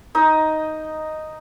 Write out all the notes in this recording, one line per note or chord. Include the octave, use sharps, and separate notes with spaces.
D#4 D#5